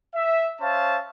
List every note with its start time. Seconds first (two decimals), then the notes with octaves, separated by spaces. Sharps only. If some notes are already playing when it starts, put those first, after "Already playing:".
0.14 E5
0.60 C#4 C5 E5 F5 A5